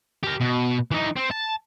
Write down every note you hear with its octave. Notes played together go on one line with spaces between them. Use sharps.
G4 A#4
B2
E3 D#4
C4
A5